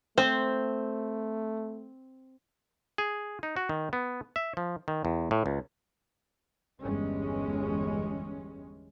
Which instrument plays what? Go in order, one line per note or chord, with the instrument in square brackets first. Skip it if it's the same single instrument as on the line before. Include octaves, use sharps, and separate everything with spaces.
[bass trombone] A3 [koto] C4 [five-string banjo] C5
[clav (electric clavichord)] G#4
D#4
F#4
D#3
B3
E5
F3
D#3
E2
A2
C#2
[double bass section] G1 E2 G3 G#3 C#4